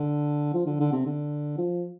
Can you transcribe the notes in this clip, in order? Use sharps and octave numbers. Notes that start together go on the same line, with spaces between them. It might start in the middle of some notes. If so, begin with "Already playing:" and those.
Already playing: D3
F3
D3
D3
C3
D3
F3